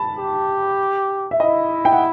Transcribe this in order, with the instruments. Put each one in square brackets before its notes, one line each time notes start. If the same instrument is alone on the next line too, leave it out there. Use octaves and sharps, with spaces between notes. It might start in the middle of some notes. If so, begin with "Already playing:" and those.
Already playing: [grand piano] A5 B5
[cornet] G4
[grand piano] E5
[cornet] E4 [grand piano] D#5
[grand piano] G5
F#5